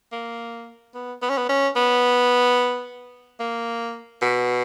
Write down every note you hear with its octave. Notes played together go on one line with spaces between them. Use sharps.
A#3
B3
B3
C#4
B3
C#4
B3
A#3
B2